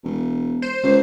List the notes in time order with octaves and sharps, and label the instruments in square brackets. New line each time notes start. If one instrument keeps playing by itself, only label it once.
[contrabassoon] E1
[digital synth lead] C5
[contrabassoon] C#2